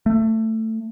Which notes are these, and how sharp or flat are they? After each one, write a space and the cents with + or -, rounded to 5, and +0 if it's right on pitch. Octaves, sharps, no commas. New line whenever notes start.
A3 +15